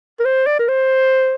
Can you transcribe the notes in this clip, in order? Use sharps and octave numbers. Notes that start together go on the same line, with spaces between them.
A#4
C5
D5
A#4
C5